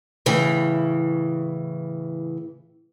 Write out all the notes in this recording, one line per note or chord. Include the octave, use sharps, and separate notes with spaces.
A2 C#3 E3